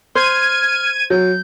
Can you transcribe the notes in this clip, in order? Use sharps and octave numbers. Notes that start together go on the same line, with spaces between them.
C5 F6 G#6 D#7
F#3 G6